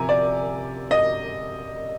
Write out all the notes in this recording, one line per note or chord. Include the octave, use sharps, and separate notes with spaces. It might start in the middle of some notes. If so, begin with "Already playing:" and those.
Already playing: C3 F3 G#5 A#5
D5
D#5